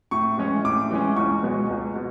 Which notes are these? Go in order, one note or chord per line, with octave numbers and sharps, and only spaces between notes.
A2 C#6
E3 G#3 C#4
A2 D6
E3 G#3 C#4
C#2 C#6
B2 G#3 B3
C#2
B2